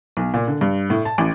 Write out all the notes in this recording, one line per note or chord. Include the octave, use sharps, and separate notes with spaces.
B1
A#2
D3
G2
A2
A5
A1